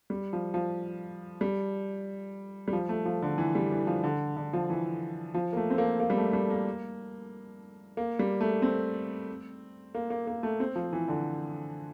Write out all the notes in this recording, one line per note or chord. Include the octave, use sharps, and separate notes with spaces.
G3
F3
F3
G3
G3
F3
A3
F3
D3
E3
G3
E3
F3
D3
D3
F3
E3
F3
A#3
A3
C4
A#3
A#3
G3
A3
G3
A#3
A#3
G3
A3
C4
A#3
A#3
A#3
A3
C4
F3
E3
D3